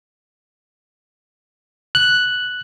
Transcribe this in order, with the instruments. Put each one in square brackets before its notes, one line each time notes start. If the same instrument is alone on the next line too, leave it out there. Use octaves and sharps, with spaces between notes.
[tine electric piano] F#6